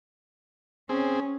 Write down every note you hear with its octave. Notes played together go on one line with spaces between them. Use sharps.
C4 C#4 G#4